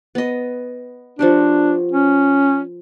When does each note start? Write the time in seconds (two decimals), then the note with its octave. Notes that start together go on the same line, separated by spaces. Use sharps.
0.15 B3 D#5
1.19 F3 D4 F#4 G4
1.92 C#4